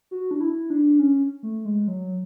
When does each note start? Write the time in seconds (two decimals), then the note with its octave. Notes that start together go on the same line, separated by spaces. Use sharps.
0.11 F#4
0.31 D4
0.40 E4
0.70 D4
0.99 C#4
1.43 A3
1.65 G#3
1.88 F#3